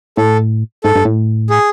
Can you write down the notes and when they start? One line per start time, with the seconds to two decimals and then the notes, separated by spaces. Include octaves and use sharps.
0.17 A2 A4
0.84 G#2 A4
0.95 G2
1.05 A2
1.50 G#4